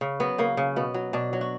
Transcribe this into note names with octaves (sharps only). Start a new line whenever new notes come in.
C#3
F#3 B3
C#3 A#3
C#3
B2 B3
F#3
B2 D4
F#3
F#4